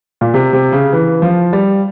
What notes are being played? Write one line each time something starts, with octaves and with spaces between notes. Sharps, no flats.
A#2
C3
C3
C#3
E3
F3
G3